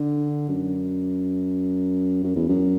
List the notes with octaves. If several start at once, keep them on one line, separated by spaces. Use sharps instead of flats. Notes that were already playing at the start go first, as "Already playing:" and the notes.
Already playing: D3
F#2
F#2
E2
F#2